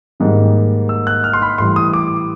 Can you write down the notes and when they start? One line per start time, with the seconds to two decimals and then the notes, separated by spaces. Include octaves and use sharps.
0.20 G#2 D#3 G3 A#3
0.89 E6
1.07 F#6
1.24 F6
1.33 C6
1.42 B5
1.58 A2 E3 G3 C6
1.76 D#6
1.93 D6